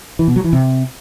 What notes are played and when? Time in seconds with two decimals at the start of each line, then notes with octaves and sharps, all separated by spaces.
0.19 E3
0.28 B2
0.36 F#3
0.44 E3
0.53 C3